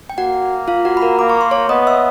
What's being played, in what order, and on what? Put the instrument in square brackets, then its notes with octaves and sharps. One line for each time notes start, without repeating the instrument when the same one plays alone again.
[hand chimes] G5
[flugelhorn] A#3 [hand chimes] F#4 F#5
[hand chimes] F4 F5
F#4 F#5
B5
A#4 A#5
[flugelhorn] A#3 [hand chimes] D6
[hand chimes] C#6
C6
C#5 C#6
[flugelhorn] B3 [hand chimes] D#5 D#6
[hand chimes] E5 E6